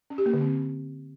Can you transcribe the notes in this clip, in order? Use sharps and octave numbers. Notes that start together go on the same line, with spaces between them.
C#4
G4
A#3
D3
C4